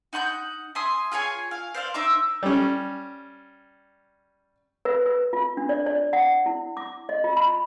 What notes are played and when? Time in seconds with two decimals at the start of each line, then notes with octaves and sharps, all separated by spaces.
0.13 D#4 F#5 C#6 G6
0.75 E5 G#5 C6 D#6
1.12 F4 G#4 C#5 G#5
1.51 F5
1.74 C5 D5 F5
1.94 D#4 C5 E5 D6
2.43 G3 C#4
4.85 B4
5.06 B4
5.33 F4
5.57 D4
5.69 D5
5.86 D5
6.13 F#5
6.46 E4
6.77 D6
7.09 D#5
7.24 F4
7.37 B5